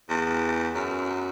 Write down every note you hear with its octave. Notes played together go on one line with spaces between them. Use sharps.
E2
F#2